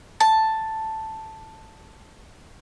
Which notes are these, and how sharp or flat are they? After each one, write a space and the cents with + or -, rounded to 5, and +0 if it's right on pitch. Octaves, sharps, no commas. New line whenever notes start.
A5 +5